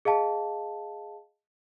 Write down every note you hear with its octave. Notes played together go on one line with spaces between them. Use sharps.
G#4 D#5 F5 A5